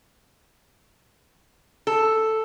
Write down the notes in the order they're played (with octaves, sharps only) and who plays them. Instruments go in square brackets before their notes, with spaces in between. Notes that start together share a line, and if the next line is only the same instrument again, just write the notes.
[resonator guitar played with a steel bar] A4